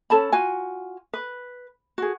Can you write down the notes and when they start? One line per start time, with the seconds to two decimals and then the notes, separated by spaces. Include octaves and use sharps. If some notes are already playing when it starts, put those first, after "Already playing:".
0.10 C#4 A4 A5 B5
0.32 F4 F#4 G#5
1.13 B4
1.98 F#4 G#4